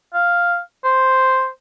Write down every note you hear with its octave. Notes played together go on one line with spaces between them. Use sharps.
F5
C5